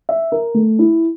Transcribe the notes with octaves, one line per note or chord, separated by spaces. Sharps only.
E5
A#4
A3
E4